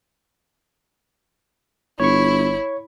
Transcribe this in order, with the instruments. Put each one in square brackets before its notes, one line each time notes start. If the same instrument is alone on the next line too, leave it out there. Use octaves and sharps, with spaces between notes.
[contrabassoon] G1 [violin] E4 [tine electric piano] C#5 C#6